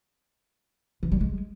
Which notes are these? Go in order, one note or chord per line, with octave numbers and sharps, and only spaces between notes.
E3
G3
G#3